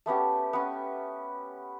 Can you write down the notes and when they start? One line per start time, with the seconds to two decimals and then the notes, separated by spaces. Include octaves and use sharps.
0.06 A3 B3 C#4 G4
0.53 B3 C#4